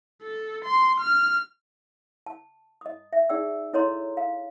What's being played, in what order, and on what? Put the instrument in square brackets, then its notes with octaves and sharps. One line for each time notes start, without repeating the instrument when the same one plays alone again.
[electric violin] A4
C6
F6
[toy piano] A5
D#5 D#6
E5
D#4 G#4 D5 G5 E6
E4 A4 C#5 D#5 A#5 C6
F5